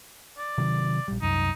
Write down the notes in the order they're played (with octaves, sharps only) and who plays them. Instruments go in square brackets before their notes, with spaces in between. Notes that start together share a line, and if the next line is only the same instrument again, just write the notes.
[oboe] D5
[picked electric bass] C3 D#3 F#3
A#1 G3
[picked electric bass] C2 F#2 [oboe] D#4